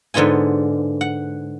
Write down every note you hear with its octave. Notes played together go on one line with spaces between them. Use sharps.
G#2 D3 B3 F4 G#5
F#5